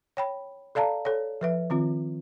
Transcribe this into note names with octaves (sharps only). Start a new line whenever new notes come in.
C#5 G5 B5
A4 D5 F5 A5 A#5
A4 C#5
F3 B4 E5
D#3 C4 F4